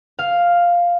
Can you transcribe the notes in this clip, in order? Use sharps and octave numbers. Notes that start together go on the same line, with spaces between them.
F5